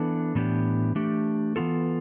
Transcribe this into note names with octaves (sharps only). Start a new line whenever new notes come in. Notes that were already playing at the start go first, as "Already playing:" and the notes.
Already playing: E3 B3 D4 A4
A2 E3 B3 D4 G4
E3 A3 D4 G4
E3 B3 F4 A4